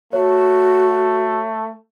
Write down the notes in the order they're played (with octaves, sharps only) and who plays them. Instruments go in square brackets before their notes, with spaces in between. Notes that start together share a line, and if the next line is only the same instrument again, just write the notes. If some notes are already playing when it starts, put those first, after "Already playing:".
[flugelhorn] A3 [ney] F#4 [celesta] C#5